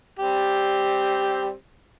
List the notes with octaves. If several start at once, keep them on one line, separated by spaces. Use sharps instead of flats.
G3 C4 G4